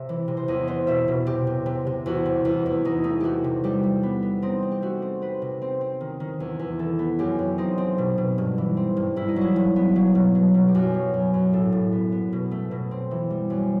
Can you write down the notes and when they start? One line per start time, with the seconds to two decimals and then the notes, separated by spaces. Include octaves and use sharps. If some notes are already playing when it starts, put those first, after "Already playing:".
Already playing: C3 E5
0.09 E3
0.28 C3
0.37 C5
0.48 E2 D#5
0.67 B3 C5
0.87 B2 E5
1.08 B2
1.26 C3 G4
1.47 C3
1.66 C3
1.87 C3
2.06 E2 F#4
2.26 C3
2.45 E2
2.66 E2
2.85 E2 D#4
3.04 A3 D#4
3.20 A3 F#4 G4
3.44 C3
3.64 G3 G4
3.83 G3
4.03 B3
4.23 B3
4.42 C4 D#4
4.63 C4
4.71 G4
4.82 A3 F#4
5.02 C4
5.22 C4 B4
5.42 C3
5.62 C4
5.81 C4
6.01 D#3
6.20 D#3
6.40 E2
6.59 E2
6.79 E3 A4
6.99 B3
7.19 F#2 G4
7.39 F#2
7.58 C4 D#4
7.78 C4
7.98 B2
8.18 B2
8.38 G2
8.58 E3
8.77 C4
8.97 G2
9.16 G2 E4
9.29 D#4
9.36 F#3 E4
9.56 G2
9.76 B3
9.96 F#3
10.15 B2
10.35 F#3
10.54 B2
10.68 G4
10.75 F#2 F#4
10.94 F#3
11.14 F#2
11.34 F#2
11.53 A2 A4
11.72 A2
11.92 B3
12.12 B3
12.33 B2
12.51 A3
12.71 B2
12.91 C4
13.11 E3
13.30 G3
13.50 F#2